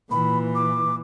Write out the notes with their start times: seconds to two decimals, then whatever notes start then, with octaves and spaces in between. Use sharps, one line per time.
0.11 A#2 E3 B5
0.55 D6